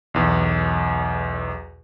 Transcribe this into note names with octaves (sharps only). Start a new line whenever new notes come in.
B1 E2